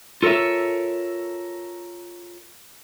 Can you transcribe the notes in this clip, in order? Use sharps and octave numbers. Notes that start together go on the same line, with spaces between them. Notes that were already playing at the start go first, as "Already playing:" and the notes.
F4 A4 A#4 C#5 E5